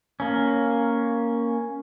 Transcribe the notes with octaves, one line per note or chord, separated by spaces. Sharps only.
A#3 C#4